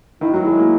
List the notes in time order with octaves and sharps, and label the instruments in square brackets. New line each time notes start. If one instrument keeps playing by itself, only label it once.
[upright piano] D#3 [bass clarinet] E4
[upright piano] F#3 [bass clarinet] F#4
[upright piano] G#3 [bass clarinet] E4
[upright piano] A#3